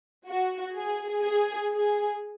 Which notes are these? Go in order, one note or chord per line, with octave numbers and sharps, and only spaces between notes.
F#4
G#4
G#4
G#4